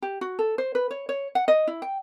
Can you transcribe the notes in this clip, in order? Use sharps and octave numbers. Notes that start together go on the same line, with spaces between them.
G4
F#4
A4
C5
B4
C#5
C#5
F#5
D#5
E4
G5